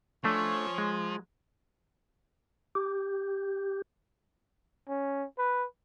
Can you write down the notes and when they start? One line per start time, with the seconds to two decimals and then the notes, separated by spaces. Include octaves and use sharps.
0.24 F3 A3 C#4 D4 C#5
0.78 G#3
2.75 G4
4.88 C#4
5.38 B4